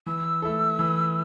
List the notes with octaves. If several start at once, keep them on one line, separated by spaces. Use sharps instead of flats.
E3 E6
A3 E4 A4
E3